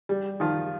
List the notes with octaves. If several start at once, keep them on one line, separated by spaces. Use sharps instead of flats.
G3
D#3 F3 F4